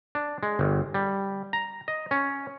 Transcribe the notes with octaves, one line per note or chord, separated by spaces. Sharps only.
D4
G#3
G1
G3
A#5
D#5
C#4